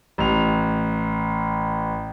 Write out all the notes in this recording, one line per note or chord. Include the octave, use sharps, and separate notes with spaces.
A1 F7